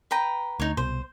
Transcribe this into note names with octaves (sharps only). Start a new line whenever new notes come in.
B4 G5 A#5
D2 D#4 C#5
C2 B2 C5